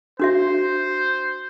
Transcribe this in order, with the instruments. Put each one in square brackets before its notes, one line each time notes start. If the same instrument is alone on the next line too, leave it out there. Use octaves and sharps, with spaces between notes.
[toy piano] D4 F#4 E5 [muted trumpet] C5